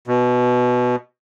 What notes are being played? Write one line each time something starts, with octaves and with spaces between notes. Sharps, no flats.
B2